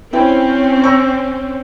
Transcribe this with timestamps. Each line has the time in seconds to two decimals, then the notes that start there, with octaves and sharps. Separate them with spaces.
0.13 C4 C#4 E4 B4 G5
0.84 C#6 E6 A#6